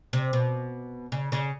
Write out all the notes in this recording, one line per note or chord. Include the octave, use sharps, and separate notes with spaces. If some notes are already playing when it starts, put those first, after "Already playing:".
C3
B2
C#3
C#3